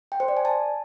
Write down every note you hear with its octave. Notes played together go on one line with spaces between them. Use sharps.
G5
C5
D5
G#5
A5